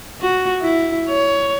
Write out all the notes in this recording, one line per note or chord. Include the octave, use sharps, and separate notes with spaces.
F#4
E4
C#5